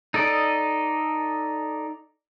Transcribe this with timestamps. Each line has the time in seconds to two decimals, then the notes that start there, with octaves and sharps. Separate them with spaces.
0.14 D#4 A4 D5 D#5